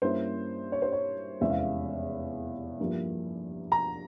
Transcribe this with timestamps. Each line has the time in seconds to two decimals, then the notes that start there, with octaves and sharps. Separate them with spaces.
0.02 G2 G3 A#3 C#4 E4 C5
0.72 C#5
0.82 C5
0.92 C#5
1.40 F1 E2 E3 G#3 C#4 E5
1.50 F5
1.59 E5
2.79 G2 F3 A#3 E4
3.72 A#5